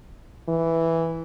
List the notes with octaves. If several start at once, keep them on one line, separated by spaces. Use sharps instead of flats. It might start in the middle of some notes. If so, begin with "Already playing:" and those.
E3